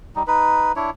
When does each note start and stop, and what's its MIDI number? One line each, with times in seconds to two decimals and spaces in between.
0.16 0.23 55
0.16 0.23 63
0.27 0.72 63
0.27 0.72 71
0.76 0.90 62
0.76 0.90 64
0.76 0.90 73